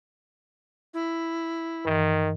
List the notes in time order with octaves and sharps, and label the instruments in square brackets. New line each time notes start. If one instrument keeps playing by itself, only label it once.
[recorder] E4
[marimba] G2 E3 [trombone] D#3